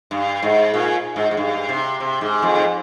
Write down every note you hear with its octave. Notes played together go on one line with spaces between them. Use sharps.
G2
G#2
A#2
G#2
G#2
G2
C3
C3
G#2
F2
G#2